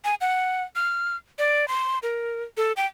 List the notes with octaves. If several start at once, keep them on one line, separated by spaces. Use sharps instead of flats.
G#5
F#5
F6
D5
C6
A#4
A4
G5